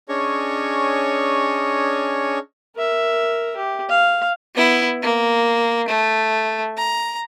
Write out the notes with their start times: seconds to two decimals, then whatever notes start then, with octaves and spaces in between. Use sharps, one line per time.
0.09 C#4 D4 G#4 C#5 D#5 C#6
2.76 A#4 E5
3.56 G4
3.89 F5
4.55 B3 E4
5.02 A#3
5.88 A3
6.77 A#5